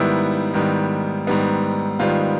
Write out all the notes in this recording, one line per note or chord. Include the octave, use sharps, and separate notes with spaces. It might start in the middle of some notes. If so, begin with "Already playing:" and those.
Already playing: G#2 D#3 G3 B3 E4
G#2 D#3 G3 B3
G#2 D#3 G3 B3
G#2 D#3 G3 B3 F4